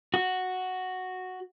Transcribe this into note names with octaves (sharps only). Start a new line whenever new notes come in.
F#4